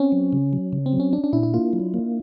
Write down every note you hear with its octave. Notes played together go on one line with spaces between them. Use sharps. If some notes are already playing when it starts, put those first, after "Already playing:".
Already playing: C4 C#4
F#3
C#3
F#3
C#3
C4
F#3
C#4
C#4 D4
D4
A#2 E4
E4
A#3 F4
F#3
A#3